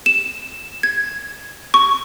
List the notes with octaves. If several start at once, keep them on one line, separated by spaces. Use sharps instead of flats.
E7
G#6
C#6